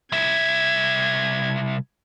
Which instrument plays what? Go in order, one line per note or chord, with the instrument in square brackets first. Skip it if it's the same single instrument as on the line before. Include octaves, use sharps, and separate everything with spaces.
[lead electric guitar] C2 E5 [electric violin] G#6